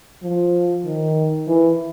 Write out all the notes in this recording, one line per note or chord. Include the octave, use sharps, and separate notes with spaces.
F3
D#3
E3